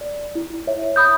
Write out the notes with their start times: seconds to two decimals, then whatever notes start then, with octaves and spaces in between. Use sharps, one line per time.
0.01 D5
0.35 E4
0.67 C#5 E5
0.96 B5 D#6 G6